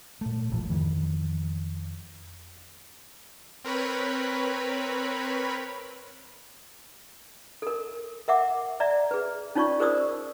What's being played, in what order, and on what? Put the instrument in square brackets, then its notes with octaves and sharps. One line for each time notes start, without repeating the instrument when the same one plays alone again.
[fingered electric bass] A#2 A3
E1 A1 F3
F2 D#3 E3
[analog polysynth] C4 A#4 B4 C#5 B5
[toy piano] A4 A#4
A#4 E5 F#5 D6
D5 E5 A#5
G#4 B4
C#4 D#4 F4 C#5 D5 C#6
G#4 A#4 C5 D5 D#6 E6